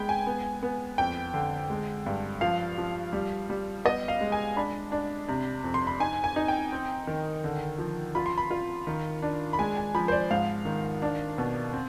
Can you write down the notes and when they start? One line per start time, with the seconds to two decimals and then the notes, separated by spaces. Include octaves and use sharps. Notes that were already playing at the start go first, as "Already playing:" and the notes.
Already playing: G#3 B3 G5 B5
0.09 G#5
0.27 B3
0.63 B3
0.98 F2 G5
1.34 D3
1.70 G#3
2.06 G2
2.41 F3 F5
2.78 F3
3.13 G3
3.50 G3
3.85 B3 D#5
4.08 F5
4.21 G#3
4.32 G#5
4.57 D4 B5
4.92 D4
5.28 C3
5.64 F2
5.74 C6
5.87 B5
6.00 D#4 G#5
6.24 G#5
6.36 D#4
6.48 G5
6.72 C4
7.07 D#3
7.44 D3
7.79 F3
8.15 F4 B5
8.26 C6
8.38 B5
8.51 F4
8.87 D#3
9.22 D4
9.53 B5
9.59 G#3 G#5
9.77 G#5
9.95 F3 B5
10.08 C5
10.12 D5
10.31 G#2 F5
10.65 D#3
11.02 D4
11.38 B2
11.73 C4